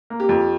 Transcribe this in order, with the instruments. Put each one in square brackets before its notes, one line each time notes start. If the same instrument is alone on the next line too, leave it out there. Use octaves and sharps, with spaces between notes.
[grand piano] A#3
[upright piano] G4
[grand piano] F2